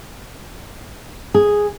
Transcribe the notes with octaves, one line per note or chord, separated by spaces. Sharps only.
G#4